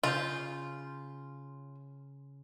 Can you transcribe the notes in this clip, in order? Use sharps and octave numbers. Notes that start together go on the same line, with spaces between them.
C#3 F4 C6 G6